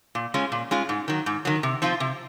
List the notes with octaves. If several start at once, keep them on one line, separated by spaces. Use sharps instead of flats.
A#2
G#3 C#4 F4
A#2
G#3 C#4 F4
G#2
D#3 F#3
G#2
D#3 F#3
C3
F3 C4 F4
C3